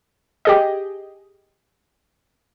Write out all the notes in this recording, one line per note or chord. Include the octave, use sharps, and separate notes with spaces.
G4 G#4 D#5